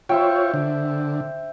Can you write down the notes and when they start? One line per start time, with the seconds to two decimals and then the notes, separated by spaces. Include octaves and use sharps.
0.09 F4 C5 C#5 E5 G5
0.54 D3